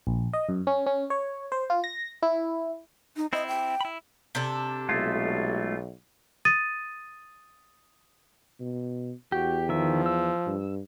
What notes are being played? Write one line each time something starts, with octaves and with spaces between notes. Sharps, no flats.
A#1
D#5
F#2
C#4
C#4
C#5
C5
F4
A#6
E4
D#4
C4 E4 D#5
G5
E4 B5
C3 D4 A4
B1 G#3 A3 F4
D#6 A6 D#7
B2
E2 F#4 G4
D#3 F3 E5
E6
G2